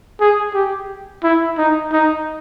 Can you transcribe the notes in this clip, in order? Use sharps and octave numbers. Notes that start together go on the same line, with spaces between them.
G#4
G4
E4
D#4
D#4